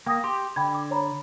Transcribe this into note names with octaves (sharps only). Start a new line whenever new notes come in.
A#3 G5 D#6 A#6
G4 C6
D3 G5 B5 G#6
D6
C#5 A#5 B5